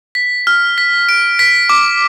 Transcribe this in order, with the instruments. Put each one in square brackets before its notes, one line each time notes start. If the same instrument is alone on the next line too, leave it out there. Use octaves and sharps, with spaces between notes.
[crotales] B6
F6
B6
D7
B6
D6